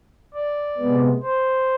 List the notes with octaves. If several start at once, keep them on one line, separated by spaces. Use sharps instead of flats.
D5
C3 G#3 B3
C5